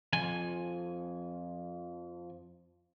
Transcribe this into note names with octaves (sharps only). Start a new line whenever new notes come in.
F2 F3 G#5